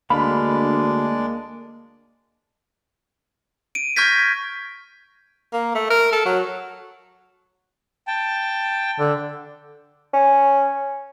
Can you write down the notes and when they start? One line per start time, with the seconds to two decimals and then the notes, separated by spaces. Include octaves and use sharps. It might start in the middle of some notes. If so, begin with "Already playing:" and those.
0.10 D2 G#3 A#3 D4 F5 B5
3.75 D7 D#7
3.96 C#6 F6 G6 G#6 A#6 B6
5.53 A#3
5.75 A3
5.90 A#4
6.12 A4
6.25 F#3
8.07 G5 A5
8.99 D3
10.14 C#4